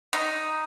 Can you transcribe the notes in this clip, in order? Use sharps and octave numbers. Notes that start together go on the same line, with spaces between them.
D#4